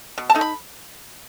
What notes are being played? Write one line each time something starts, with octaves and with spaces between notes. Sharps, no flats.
B2
A5
A3 D#4
B5